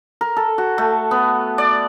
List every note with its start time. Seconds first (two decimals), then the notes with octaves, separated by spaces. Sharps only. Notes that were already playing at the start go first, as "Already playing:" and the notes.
0.21 A#4
0.37 A4
0.58 F#4
0.78 A3
1.11 B3
1.58 D5